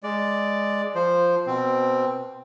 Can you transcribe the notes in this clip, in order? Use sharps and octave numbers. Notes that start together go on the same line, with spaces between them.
G#3 D5
F3 C5
B2 C4